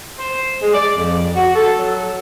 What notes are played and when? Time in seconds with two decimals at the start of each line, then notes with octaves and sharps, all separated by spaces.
0.18 C5
0.60 G#3
0.73 D5
0.97 F2
1.34 F#4
1.55 A4
1.77 F#3